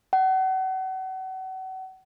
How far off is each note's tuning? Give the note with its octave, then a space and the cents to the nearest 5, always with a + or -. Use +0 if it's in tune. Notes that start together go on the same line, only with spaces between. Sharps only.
F#5 +35